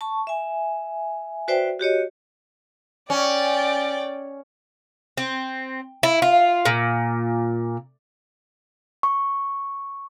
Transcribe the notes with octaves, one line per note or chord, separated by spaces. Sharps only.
A5 C#6
E5 G#5
F#4 B4 C5 D5 E5 G5
F#4 G4 C#5 D#5
C#4 D5 G5
C4
E4
F4
A#2
C#6